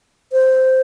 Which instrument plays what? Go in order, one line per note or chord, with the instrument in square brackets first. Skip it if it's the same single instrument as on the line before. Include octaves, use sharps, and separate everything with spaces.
[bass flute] C5